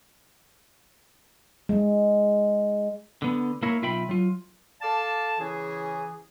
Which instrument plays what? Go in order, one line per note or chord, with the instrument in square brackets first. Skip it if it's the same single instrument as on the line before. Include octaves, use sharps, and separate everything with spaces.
[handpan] G#3
[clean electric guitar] D3 B3
A#3 E4 A#4 C#5
B1 F4 E5 G5 B5
F#3 F4
[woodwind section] A4 D5 F5 A5
C#3 E3 E4 G#4